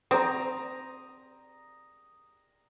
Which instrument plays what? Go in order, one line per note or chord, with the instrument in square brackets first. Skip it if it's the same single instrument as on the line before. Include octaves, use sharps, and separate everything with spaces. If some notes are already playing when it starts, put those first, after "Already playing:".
[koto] C4 [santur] A#5 D#6